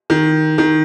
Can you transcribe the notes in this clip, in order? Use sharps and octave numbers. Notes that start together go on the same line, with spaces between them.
D#3
D#3